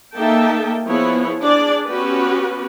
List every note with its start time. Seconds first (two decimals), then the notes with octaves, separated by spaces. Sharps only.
0.17 A#3 D#4 A4 E5 G5 A5
0.86 F3 B3 E4 G#4 C#5
1.41 D4 G#4 D5
1.88 B3 C#4 F#4 G4 B4